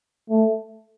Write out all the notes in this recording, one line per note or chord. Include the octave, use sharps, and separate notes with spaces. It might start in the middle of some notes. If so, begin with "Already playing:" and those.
A3